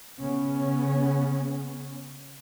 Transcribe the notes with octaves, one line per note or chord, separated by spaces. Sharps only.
C#3 B3 C#4